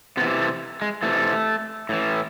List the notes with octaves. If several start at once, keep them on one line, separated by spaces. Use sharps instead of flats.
C3 E3 B3
A3
G#3
C3 E3 A3
A2 E3